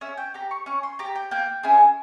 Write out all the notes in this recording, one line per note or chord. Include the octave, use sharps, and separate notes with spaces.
C#4 E5
G5
G4 A#5
C#6
C#4 C#6
C6
G4 A#5
G5
A#3 G5
C#4 E4 G#4